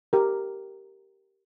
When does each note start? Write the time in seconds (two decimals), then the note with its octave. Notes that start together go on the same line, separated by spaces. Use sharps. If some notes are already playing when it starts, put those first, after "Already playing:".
0.13 G4 A#4